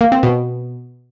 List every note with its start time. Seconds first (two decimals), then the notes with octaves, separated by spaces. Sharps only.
0.01 A#3
0.12 C4
0.23 B2